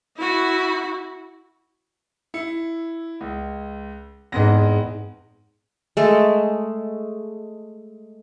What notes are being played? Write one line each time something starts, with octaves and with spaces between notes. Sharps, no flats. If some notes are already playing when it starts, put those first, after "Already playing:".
E4 F#4
E4 C#7
C#2
E2 G#2 B3 C4 D#5 A#6
G#3 A3 A4